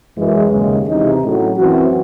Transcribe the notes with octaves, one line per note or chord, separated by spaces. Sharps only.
F#2 E3 G#3
D#2 C#3 G#3
C3 E3 G#3 D#4
A2 F#3 C#4 F#4
F#2 E3 C4 F#4